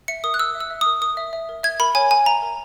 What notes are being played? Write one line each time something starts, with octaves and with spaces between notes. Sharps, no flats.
E5 C#7
A#4 D#6
F#6
A#4 E6
E5
E6
E5
A#4 D#6
A#4 D#6
E5
E5
A#4
E5 G#6
A#4 B5
C#5 G#5
A#4 G#5
E5 A#5
A#4